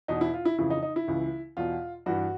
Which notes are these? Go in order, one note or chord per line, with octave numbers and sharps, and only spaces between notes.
E2 B2 D#4
E4
F4
E4
F2 C#3 E3 E4
D#4
D#4
E4
C#2 C#3 E3
E2 B2 F4
G2 E3 F#4